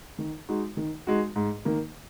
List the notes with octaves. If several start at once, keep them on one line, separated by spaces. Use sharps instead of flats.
D#3
G#3 D#4 F#4
D#3
G#3 D#4 F#4
G#2
D#3 A#3